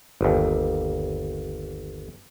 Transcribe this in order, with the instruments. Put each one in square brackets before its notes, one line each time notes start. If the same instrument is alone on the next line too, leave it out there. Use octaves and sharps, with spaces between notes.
[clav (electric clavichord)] G1 D#2